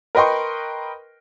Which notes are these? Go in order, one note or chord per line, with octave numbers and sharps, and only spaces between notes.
A#4 B4 D#5 G5 C6 C#6